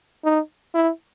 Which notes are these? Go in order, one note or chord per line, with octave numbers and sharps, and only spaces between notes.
D#4
E4